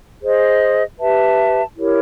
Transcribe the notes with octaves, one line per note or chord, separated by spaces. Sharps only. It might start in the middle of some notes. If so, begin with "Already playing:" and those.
G#4 C5 D#5
G4 B4 E5 A5
E4 G4 A#4 C#5